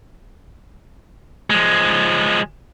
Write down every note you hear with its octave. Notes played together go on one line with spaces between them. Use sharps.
F3 G#3